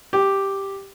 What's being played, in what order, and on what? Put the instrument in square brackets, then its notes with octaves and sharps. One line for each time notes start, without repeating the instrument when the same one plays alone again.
[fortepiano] G4